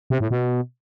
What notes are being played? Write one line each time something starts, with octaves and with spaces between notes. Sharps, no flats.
C3
A2
B2